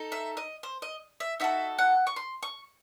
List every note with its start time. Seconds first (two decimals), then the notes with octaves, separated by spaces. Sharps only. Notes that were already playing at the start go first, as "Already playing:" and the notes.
Already playing: D#4 A4
0.12 E5
0.37 D#5
0.63 C5
0.82 D#5
1.20 E5
1.40 D#4 F#4 A4 E5
1.78 F#5
2.07 C#6
2.16 C6
2.43 C#6